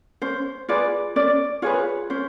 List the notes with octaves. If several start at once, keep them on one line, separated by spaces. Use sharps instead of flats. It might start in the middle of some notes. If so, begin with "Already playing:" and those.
C#4 C5
F4 G#4 B4 D5
C#4 D5
F4 G#4 B4 C#5
C#4 C5